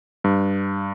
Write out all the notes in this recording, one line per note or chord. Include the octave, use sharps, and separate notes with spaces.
G2